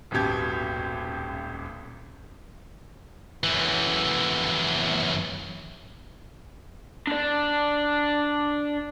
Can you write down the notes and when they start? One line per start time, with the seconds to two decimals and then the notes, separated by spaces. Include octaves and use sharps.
0.11 D#1 G#1 F#2 B2 G4 G#6
3.43 F#2 E3
7.07 D4 D5